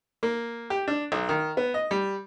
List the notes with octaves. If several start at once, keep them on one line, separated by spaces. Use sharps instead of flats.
A#3
G4
D4
B1
D#3
B3
D#5
G3